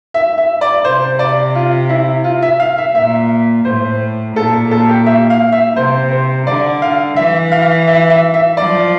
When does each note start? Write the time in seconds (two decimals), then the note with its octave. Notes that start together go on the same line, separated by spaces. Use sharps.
0.14 E5
0.38 E5
0.61 D5
0.84 C3 C5
1.19 D5
1.55 F4
1.89 E4
2.24 F4
2.42 E5
2.60 F5
2.78 E5
2.95 A#2 E5
3.65 A2 C5
4.36 A#2 A4
4.71 A4
4.89 G4
5.06 E5
5.30 F5
5.52 E5
5.76 C3 C5
6.11 C5
6.47 D3 D5
6.82 F5
7.16 E3 E5
7.52 F5
7.87 E5
8.10 E5
8.34 E5
8.57 F3 D5